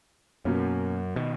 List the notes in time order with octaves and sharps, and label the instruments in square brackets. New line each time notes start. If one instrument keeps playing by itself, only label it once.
[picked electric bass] F#2 [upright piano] B2 A#3 C#4
[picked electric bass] B2 D#3